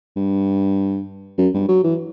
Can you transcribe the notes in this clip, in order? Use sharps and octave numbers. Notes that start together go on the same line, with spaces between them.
G2
F#2
G2
F#3
E3